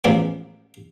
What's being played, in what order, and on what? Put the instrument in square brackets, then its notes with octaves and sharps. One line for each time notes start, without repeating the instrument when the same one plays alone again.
[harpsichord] A1 F#2 F3 G#3 B3 D6